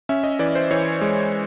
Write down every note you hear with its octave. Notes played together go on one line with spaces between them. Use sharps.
C#4 E5
D#5
E3 D5
C5
E3 C#5
G#3